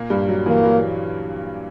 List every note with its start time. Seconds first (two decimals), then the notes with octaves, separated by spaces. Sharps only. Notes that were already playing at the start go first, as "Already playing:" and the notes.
Already playing: A#2 A#3
0.10 G2 G3
0.28 F#3
0.46 E3 A#3
0.64 F#3